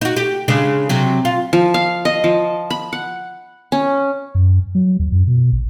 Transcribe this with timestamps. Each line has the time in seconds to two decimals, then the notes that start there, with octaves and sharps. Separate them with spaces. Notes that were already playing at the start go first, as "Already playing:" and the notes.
0.01 D#4 F#4
0.17 G4
0.48 C#3 G#3 D4
0.89 C3 F#3
1.25 F4
1.53 F3
1.74 F5
2.05 D#5
2.24 F3
2.70 B5
2.93 F#5
3.72 C#4
4.35 F#2
4.75 F#3
4.99 D#2
5.12 F#2
5.27 B2
5.52 A#1